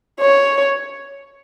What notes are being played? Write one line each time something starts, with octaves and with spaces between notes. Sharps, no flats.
C#5